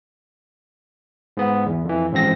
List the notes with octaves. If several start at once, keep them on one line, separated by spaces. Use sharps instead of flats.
G#2 B3
E2
F2 E3
A1 G#2 F3 C4 A#6